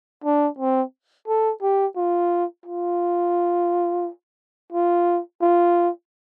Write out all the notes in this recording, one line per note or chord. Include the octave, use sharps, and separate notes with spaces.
D4
C4
A4
G4
F4
F4
F4
F4